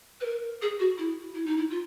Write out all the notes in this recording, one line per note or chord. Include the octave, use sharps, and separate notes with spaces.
B4
A#4
G#4
F#4
E4
E4
D#4
E4
F4